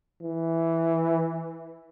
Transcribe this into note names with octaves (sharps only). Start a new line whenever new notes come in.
E3